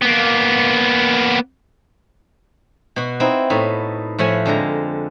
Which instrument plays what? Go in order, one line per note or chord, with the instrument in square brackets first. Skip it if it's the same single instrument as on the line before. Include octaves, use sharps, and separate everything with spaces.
[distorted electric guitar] A#3 B3
[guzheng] B2 F#4
C4 D#4 E4
A2 B3 D#4
A2 F3 E5 F#5 G#5
F2 D3 G#3 A#5